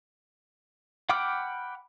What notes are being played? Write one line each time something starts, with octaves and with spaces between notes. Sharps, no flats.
F#5 G5 B5 D6 F6